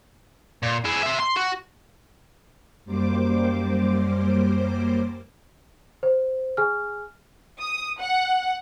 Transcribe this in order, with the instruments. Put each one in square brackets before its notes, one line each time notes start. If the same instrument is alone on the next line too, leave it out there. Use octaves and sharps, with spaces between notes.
[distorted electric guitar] A#2
E4 G#4
C5 E5
C6
F#4
[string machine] F#2 G3 A#3 C5 D6
[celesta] C5
G#4 G#5 F6
[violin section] D#6
F#5